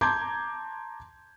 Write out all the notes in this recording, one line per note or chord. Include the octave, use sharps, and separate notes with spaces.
A5 A#5 C6 D6 G6 G#6